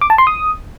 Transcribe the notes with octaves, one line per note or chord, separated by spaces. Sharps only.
D6
A5
C6
D#6